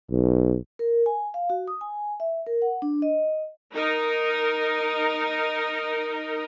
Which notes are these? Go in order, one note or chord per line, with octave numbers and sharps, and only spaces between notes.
B1
A#4
G#5
F5
F#4
D#6
G#5
E5
A#4
F#5
D4
D#5
D#4 A#4